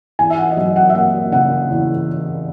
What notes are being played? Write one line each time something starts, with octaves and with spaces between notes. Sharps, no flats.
E2 G#5
E5
F#5
D#5
F#3 E5
F#5
E5
A#3 F#5
C#3 F#5
E2